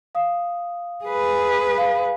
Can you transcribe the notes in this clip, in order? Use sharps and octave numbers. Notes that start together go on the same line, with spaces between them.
F5 D#6
G#4 B4
F5